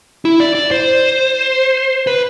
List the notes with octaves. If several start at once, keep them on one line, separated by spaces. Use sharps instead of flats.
E4
D5
D5
C5
B4